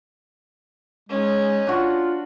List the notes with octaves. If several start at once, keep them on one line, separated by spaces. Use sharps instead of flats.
G#3 C#4 D#4
D4 F4 F#4